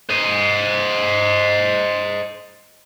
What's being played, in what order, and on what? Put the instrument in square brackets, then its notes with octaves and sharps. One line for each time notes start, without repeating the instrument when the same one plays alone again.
[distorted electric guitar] C5 D#5